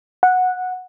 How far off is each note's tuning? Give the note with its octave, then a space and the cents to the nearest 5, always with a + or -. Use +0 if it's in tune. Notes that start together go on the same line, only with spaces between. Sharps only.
F#5 -10